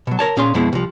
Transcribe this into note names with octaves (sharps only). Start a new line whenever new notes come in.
B2 F#3
A#4 C#5 A5
A#2 C#4 G#4 F5 C6
F2 B2 G#3 B3 E4
C2 F3